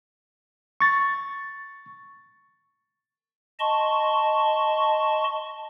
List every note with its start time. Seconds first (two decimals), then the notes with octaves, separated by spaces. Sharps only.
0.80 C#6 A6
3.59 D#5 A5 C6 C#6